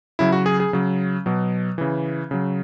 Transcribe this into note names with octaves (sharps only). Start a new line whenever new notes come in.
C#3 F#3 E4
F#4
G#4
G#4
C#3 F#3
B2 F#3
C#3 E3
C#3 F#3